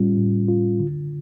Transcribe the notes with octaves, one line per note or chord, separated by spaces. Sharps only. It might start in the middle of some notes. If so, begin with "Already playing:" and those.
Already playing: A2 G3 C#4 F4
A2
F4
D3